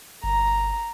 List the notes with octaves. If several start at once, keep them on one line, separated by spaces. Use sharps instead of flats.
G1 A#5